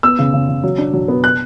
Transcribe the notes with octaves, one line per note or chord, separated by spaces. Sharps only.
B3 E6
C#3
C#3
C#3
F#3
D4
F#3
B3
F#6